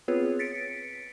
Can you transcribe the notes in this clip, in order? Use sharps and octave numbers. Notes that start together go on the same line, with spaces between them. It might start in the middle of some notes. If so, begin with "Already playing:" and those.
B3 C4 F4 G#4 B4 C#5
A6 B6 C#7 D7